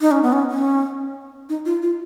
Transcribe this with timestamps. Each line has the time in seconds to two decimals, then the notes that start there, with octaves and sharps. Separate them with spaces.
0.01 D#4
0.11 C#4
0.23 B3
0.33 C#4
0.51 C#4
1.49 D#4
1.66 F4
1.82 F4